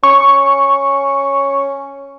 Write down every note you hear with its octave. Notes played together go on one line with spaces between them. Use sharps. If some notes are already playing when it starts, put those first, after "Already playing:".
C#4 C#6